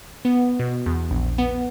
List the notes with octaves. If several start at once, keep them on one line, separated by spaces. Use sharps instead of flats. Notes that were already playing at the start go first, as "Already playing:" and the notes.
B3
B2
E2
A#1
B3